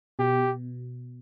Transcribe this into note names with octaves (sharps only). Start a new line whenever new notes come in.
B2 G4